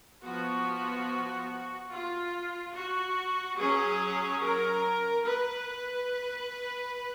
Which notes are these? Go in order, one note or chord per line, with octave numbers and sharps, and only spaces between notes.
F3 B3 F#4
F4
F#4
F#3 C#4 G#4
A#4
B4